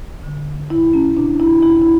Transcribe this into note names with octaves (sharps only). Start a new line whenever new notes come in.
D3
E2 E4
C#4
B2 D4
E4
E2 E4
E4